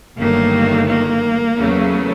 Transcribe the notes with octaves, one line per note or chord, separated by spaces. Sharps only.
G1 G2 D#3 F#3 A3 A#3
A#3
E2 C#3 F#3 A3